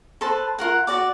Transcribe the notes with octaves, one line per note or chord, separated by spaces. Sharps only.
A4 B4 C5 A5
F4 A#4 F#5
F#4 D5 D6